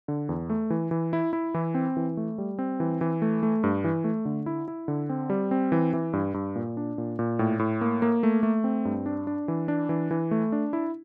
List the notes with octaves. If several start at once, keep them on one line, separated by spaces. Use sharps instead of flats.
D3
E2
A3
E3
E3
E4
E4
E3
C4
E3
A3
G3
C4
E3
E3
A3
A3
G2
E3
A3
D3
E4
E4
D3
C4
G3
C4
E3
E3
G2
G2
A#2
D4
A#2
A#2
A2
A2
A#3
A#3
A3
A3
C4
G2
D4
D4
E3
D4
E3
E3
A3
D4
E4